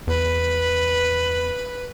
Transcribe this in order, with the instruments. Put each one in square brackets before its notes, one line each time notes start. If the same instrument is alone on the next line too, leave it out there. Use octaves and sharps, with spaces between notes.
[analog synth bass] E2 [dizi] B4